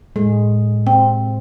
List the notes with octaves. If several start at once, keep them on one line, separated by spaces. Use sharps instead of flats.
A2 G#3
C4 G5